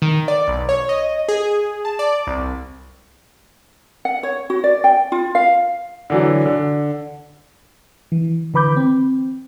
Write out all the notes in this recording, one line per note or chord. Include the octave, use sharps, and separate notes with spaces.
D#3
D5
B1
C#5
D#5
G#4
A5
D5
C2
F#5
C#5
F#4
D5
G5
F4
F5
D3 E3 F#3
D3
E3
D3 E3 B4 B5 D6 G6
C4